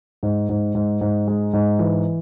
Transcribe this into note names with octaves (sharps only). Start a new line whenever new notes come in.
G#2
G#2
G#2
G#2
G#3
G#2
E3